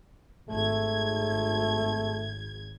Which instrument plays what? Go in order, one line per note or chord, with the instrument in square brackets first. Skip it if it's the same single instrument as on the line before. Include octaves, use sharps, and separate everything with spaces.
[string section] G#1 G#6 [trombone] A3